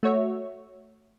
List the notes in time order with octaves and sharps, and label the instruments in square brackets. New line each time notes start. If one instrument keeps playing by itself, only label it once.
[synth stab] A3 F#4 C#5 E5